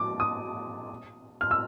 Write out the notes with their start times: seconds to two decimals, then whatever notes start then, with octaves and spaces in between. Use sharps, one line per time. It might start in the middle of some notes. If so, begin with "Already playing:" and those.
Already playing: D6
0.20 D#6
1.41 F6
1.51 E6